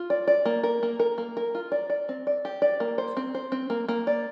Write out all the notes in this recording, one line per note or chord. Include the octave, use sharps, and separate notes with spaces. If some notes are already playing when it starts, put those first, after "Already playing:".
Already playing: F4
D5
D5
A#3
A#4
A#3
A#4
A#3
A#4
F4
D5
D5
C4
D5
G4
D5
A#3
C5
C4
C5
C4
A#3
A#3
D5